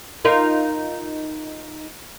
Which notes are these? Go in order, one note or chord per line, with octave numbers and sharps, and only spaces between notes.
D#4 F4 A#4